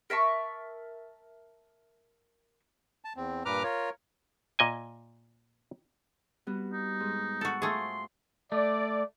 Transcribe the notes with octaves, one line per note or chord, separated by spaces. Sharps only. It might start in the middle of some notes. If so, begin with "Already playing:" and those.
A#4 E5 A5 C#6
A5
E2 C4
G2 A#2 B4 A#5 D6 F6
F4 A#4 C#5
A#2 D#5 G#5
G3 B3 F#4
D#4
G#2
F#4 A4
A3 F4 G#4 C5 C6
A3 D5